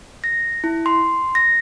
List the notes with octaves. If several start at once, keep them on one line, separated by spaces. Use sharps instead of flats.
A#6
E4
C6
A#6